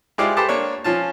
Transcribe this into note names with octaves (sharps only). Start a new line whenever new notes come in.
G#3 E4 F4 G4 C5 D5
G4 A4 B4 C5 A5 D6
A#3 D4 C#5
F3 C#4 F4 A5